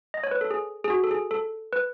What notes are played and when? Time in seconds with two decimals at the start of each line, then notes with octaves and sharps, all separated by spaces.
0.14 D#5
0.24 C#5
0.31 B4
0.41 A4
0.51 G#4
0.84 G#4
0.90 F#4
1.04 A4
1.11 G#4
1.31 A4
1.73 B4